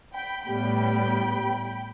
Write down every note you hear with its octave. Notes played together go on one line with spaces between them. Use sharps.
G5 B5
A2 G3 B3 G5 B5